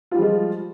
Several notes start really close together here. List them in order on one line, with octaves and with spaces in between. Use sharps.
F4 G3 F3 G#3